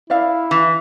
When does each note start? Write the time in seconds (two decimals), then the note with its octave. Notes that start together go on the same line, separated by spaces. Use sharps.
0.10 E4 D5 E5 F5
0.51 E3